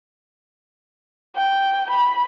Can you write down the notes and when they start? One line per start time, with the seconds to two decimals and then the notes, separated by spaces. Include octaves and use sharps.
1.36 G5
1.90 B5